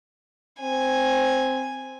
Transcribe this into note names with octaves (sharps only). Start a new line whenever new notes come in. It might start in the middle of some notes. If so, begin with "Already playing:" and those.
C4 G#5